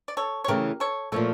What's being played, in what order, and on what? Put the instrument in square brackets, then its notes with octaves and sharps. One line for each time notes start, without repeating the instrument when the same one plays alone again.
[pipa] D5
A4 C#5
C#5
[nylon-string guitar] C#3 E3 A3 [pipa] G4 A#4
[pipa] A4 C#5
[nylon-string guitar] A#2 F3 A3 [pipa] A4 C#5